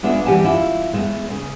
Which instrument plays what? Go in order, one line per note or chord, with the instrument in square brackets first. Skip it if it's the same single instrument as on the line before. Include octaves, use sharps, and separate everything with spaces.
[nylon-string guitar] G#3 B3 D4 F4 E5
E3 G3 G4 F#5 G#5 A5
E4 F4
G#3 A3 B3
C#3